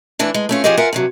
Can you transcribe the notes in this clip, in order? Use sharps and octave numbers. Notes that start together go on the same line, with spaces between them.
E3 A3 D4 E4
G#3
A3 C#4 F4
F3 C#4 G4 G#4 C5 D#5
F4 A#4 E5 F#5 G#5
G2 C3 F#3